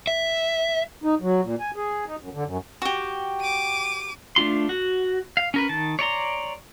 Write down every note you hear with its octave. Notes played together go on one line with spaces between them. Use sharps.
E5
D#4
F#3
A#2
G#5
G#4
D#4
F#2
D3
F#2
F#4 G4
D6 D#7
A3 D4 F4 C6
F#4
F5
C#4 A#4 B4
D#3 A5
C#5 D5 A#5 C6